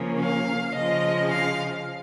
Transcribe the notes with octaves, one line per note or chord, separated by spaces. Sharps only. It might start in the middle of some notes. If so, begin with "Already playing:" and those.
Already playing: C#3 F3 A#3 C#4
F5
C#3 F3 G#3 D#5
F5